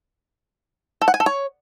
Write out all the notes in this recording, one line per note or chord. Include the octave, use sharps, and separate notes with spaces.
A4
F#5
G#5
A4
C#5